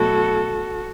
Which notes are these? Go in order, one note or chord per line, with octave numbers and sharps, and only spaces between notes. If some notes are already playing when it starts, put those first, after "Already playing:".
Already playing: B2 F#3 A3 E4 F#4 A4